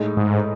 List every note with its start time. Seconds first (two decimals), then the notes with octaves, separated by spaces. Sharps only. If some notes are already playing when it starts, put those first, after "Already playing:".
Already playing: A2 G#3 D#4
0.17 G#2